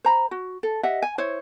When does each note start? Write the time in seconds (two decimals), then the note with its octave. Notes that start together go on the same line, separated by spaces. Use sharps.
0.05 C5 A#5 B5
0.31 F#4
0.63 A4
0.83 G4 D#5 E5 F#5
1.02 G#5
1.18 E4 C5 C#5